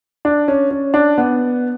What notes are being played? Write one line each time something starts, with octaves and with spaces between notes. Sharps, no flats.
D4
C#4
C#4
D4
B3